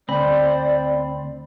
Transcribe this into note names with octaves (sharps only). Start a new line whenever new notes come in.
D2 C4 C5 D5 B5